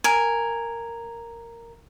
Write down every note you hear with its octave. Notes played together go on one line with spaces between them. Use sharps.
A#4 G#5